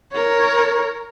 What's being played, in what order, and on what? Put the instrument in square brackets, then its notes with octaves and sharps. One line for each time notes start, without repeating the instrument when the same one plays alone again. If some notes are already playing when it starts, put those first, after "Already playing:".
[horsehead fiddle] A#4 C#5